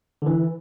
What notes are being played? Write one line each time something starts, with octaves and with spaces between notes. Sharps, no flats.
D3
E3